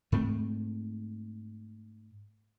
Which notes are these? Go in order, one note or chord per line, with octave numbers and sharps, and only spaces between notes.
G#2 A3 C4